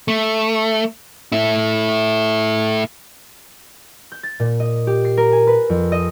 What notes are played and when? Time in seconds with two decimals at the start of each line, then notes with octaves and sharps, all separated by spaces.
0.08 A3
1.32 A3 E4
4.12 G6
4.23 A6
4.40 A#2
4.60 D#5
4.87 G4
5.05 C7
5.17 A#4
5.32 G#5
5.47 B4
5.70 F2
5.92 D#5